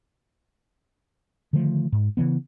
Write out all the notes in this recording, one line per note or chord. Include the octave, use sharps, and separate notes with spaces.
D3 D#3 F3 A3
G#2
C#3 E3 B3